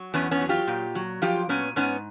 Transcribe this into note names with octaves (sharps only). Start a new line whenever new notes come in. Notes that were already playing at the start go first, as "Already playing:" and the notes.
Already playing: F#3
E2 B3 C#4
B3 C#4
F#3
F4 G4
A#2
F#3
F3 F4 G4
A#2 B3 C#4
G#2 B3 C#4